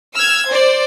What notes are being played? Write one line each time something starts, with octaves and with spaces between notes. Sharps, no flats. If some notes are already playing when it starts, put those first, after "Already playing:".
E6 F6 G#6
C5 D5